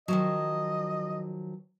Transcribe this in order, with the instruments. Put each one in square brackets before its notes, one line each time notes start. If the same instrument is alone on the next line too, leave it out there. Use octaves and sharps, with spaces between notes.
[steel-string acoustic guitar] D#3 F3 F#3 [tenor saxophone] D#5